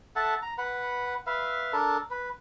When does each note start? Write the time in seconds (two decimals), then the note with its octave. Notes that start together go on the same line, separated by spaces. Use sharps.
0.16 A4 E5 F#5 A5
0.42 A#5
0.58 B4 F#5
1.27 B4 E5 F5
1.73 D4 A4 A#4
2.11 B4